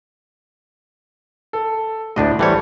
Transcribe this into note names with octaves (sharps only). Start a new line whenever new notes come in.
A4
D2 A2 D4 D#5
E3 G3 A4 C5 C#5